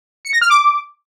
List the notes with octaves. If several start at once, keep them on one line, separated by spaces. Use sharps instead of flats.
C#7
A#6
F6
D6